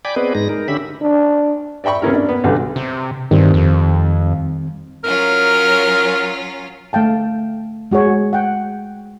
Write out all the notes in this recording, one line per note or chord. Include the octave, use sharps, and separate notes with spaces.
D5 G5 G#5 B5 D6
B3 C4 G#4 B4 D5 D#5
G#2 G#3 D#4 A#6
D#4 A#4
D3 C#4 G4 E5 B5
D4
D5 E5 G5 B5 C#6
C3 B3 C#4 E4 A#4
D4
B3
B1 D3 G3 F#4
C3
G2 D#3 G3 C4
F2
F#3 C#4 F4 A#4
A3 F5 G5 A5
G#3 F#4 G#4 C#5 E5
F#5 G5